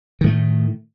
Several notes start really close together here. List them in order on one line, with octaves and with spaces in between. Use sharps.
D#3 A2 A3